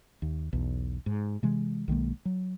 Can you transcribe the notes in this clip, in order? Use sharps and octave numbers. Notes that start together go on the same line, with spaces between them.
D#2
B1 E2
G#2
C3 E3 G#3
B1 D#3 G#3 A#3
F#3